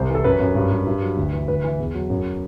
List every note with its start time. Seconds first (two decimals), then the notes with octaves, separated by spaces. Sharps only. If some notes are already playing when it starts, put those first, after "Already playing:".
Already playing: C2 C5
0.09 E3
0.15 A4
0.24 F#2 B4
0.40 F#2
0.55 G2
0.71 G2
0.86 G2
1.02 F#3
1.17 D2
1.33 E3
1.48 D2 B4
1.63 E3
1.79 E2
1.94 F#3
2.10 F#2